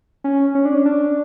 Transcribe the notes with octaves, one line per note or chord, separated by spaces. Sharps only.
C#4
C#4
D4
C#4
D4